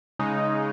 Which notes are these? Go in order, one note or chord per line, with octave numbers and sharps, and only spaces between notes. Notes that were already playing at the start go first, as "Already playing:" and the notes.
C#3 G#3 D#4